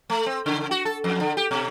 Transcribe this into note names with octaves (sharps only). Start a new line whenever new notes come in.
A3
C4
C#3
F#4
A4
F2
D3
G4
B2